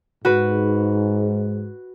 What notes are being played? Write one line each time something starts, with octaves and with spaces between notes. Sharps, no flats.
G#2 F#4 B4